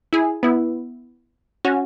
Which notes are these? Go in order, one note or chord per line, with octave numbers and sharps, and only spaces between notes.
E4 G#4
B3 E4
C#4 F#4